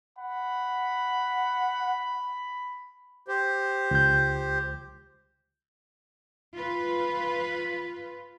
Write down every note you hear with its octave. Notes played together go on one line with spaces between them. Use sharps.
F#5 B5
G4 C5
C#2 G6
F4 B4